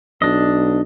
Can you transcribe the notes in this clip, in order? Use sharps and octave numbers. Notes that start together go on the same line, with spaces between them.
B1 D4 D#5